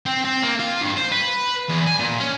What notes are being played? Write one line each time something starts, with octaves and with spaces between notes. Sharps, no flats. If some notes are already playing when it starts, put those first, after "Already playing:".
C4
C4
A#3
F4
G2
C5
B4
E2
G#5
A#2
C#4